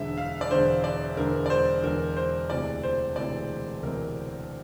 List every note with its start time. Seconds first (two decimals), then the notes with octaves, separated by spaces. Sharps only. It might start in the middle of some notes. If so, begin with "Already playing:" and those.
Already playing: E1 E2 D3 E5
0.18 F5
0.41 D5
0.51 E1 E2 D3 C5
0.84 D5
1.17 E1 E2 D3 A#4
1.46 D5
1.50 C5
1.84 E1 E2 D3 A#4
2.17 C5
2.50 E1 D2 C3 E3 D5
2.83 C5
3.16 E1 D2 C3 E3 D5
3.82 E1 D2 C3 E3 A#4